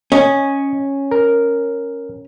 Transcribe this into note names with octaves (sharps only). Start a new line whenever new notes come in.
C#4 D#5
A#4